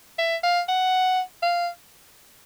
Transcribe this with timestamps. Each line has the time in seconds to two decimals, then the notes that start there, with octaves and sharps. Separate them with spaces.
0.19 E5
0.43 F5
0.69 F#5
1.43 F5